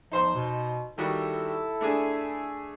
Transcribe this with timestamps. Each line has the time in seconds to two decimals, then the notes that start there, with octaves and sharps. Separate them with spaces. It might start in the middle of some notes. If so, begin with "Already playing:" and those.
0.12 E2 F3 D#4 C5 C6
0.34 B2
0.98 D#3 G3 E4 F#4 A4
1.81 A3 D4 G#4